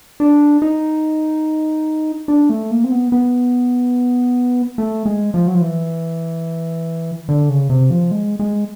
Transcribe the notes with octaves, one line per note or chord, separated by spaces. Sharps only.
D4
D#4
D4
A3
A#3
C4
B3
B3
A3
G#3
F3
F#3
F3
E3
D3
C#3
C3
F3
G#3
G#3